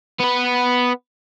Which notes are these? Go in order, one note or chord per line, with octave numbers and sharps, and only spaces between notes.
B3 B4